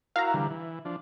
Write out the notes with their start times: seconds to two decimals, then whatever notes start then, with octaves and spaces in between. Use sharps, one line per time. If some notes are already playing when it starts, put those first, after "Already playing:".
0.16 E4 F#4 A#4 F5 A#5
0.34 D3 E3 G3
0.50 E3
0.85 F3 D4